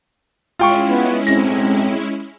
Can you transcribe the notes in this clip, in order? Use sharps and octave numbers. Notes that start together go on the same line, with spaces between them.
G#3 C#4 E4 F4 G5 C#6
B3
B1 A2 C4 A#6